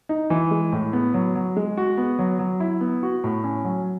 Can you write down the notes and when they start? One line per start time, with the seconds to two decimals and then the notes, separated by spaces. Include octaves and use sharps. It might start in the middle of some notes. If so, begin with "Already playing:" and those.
0.09 D#4
0.30 E3
0.51 G#3
0.72 A2
0.93 B3
1.14 F#3
1.35 F#3
1.56 G#3
1.77 F#4
1.98 B3
2.19 F#3
2.39 F#3
2.60 E4
2.81 B3
3.03 F#4
3.24 A2
3.44 C#4
3.65 F#3